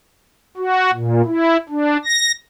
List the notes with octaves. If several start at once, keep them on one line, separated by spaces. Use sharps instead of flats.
F#4
A#2
E4
D4
A#6